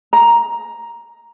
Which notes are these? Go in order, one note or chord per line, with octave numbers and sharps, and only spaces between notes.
A#5